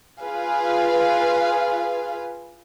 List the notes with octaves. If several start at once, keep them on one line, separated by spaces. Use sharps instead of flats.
F4 G#4 B4 F5